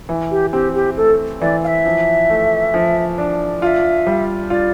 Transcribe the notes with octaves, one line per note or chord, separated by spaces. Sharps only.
E3
G4
C4 G4
G4
A3 A4
E3 D5
F5
E5
F3
A3
F3
D4
F4 E5 F5
G3
F4 D5